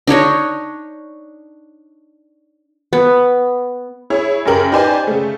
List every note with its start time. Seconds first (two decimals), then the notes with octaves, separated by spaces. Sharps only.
0.07 D4 D#4 C#5 D#5
2.93 B3
4.10 E4 G#4 C#5
4.45 F#2 C#3 G4 A#4 F#7
4.72 D#4 G4 B4 C5 D5 G#5
5.07 C#3 A3